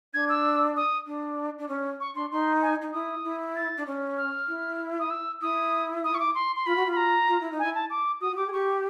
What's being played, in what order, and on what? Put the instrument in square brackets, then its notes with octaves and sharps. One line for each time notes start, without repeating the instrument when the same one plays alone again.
[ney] D4 [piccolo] G#6
[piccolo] E6
D#6
[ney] D4
D4
C#4
[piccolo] C#6
[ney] D4 [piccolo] C6
[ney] D#4 [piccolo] C6
[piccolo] G#5
[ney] D#4
[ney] E4 [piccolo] D#6
[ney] E4
[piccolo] A6
[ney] D4
C#4
[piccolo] F6
[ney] E4
[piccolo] D#6
E6
[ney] E4 [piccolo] D#6
[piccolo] D#6
C#6
D6
C6
C6
[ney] F4 [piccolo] B5
[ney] F#4
F4
[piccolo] B5
A#5
[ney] F4
E4
D#4
[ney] E4 [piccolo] G#5
[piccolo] A5
D6
[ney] F#4 [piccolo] D#6
[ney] F#4
[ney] G4 [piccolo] D6
[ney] G#4
[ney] G4 [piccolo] C#6